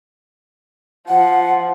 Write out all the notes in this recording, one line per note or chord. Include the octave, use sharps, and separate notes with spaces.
F3 F#5